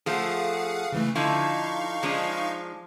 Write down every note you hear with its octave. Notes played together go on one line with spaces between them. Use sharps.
F3 A3 G#4 F5 F#5
C#3 E3 A3
D3 F3 D#4 E4 F5 C#6
F3 G#3 D4